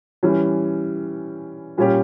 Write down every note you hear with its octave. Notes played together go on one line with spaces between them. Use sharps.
E3 G3 C#4
A#2 G3 C#4 G4